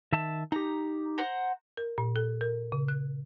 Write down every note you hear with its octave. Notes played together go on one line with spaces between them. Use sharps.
D#3 E5 A5
D#4 G4 A#5
C5 F#5 A#5
A#4
A#2
A4
A#4
C#3
F#6